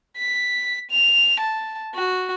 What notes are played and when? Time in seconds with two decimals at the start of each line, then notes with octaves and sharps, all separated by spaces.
0.18 B6
0.91 F7
1.40 A5
1.95 F#4